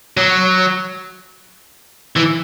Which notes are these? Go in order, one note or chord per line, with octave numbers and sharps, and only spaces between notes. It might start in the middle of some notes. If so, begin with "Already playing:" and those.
F#3
E3